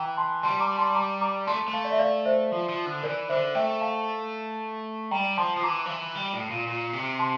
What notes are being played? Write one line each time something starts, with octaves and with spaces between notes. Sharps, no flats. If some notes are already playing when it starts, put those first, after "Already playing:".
Already playing: E3 G5 A#5
A5 C6
G3 A5 C6
A#5 D6
A5 C6
A#5 D6
A#5 D6
A3 A5 C6
A3
F5 A5
D5
E5
D5 F5
C5 E5
F3
F3
D3
E3 A#4 D5
D3 C5 E5
A3 E5 G5
F5 A5
G3 G5 A#5
F3 A5 C6
F3
E3 A#5 D6
F3
E3
G3
A2
A#2
A#2
C3
A5 C6